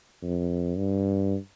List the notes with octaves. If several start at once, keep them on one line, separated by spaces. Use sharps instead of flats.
F2
G2